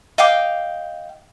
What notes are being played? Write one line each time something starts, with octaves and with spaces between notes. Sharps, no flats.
D#5 F5 G5 D6